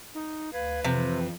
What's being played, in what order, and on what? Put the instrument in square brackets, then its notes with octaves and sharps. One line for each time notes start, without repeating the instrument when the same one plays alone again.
[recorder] D#4
[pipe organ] D2 F5 G#6 [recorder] B4
[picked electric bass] F2 [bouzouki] C3 [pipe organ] E3